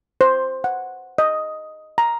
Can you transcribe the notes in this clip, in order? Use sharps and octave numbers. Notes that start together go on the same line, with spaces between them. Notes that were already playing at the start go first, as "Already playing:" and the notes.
C5
F#5
D#5
A#5